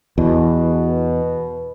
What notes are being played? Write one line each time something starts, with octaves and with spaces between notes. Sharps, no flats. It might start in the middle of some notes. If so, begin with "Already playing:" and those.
E2 B2